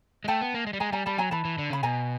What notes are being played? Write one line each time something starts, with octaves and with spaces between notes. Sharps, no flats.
G#3
A3 G5 A5
B3
A#3
G#3
G3
G#3 G#5 A#5
G3 G#5 A#5
G3 A5 B5
F#3 G#5 A#5
E3 A5 B5
E3
D3
C#3 B5
B2 G#5 A#5